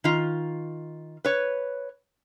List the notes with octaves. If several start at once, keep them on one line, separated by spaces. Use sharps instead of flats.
D#3 F4
B4 C#5